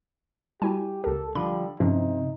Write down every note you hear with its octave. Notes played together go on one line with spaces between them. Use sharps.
G3 E4 F#4 G4 G#5
C#2 G4 A4 A#4
D3 F3 G3 B5
G2 C3 F3 C4 C#4 D#4 E4